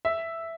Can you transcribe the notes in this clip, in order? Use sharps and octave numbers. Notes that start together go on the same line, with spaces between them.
E5